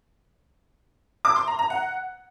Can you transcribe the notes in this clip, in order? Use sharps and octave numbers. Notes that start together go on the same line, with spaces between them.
D6
C6
A#5
A#5
F#5